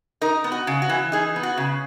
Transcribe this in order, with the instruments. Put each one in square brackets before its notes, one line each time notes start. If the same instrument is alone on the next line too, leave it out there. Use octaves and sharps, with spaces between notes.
[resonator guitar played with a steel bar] D#4 A#4
B3
F#4
C#3
F#4
E3
D#4 G#4
B3
F#4
C#3